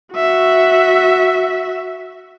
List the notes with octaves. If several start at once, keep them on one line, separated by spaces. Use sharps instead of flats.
F#4 E5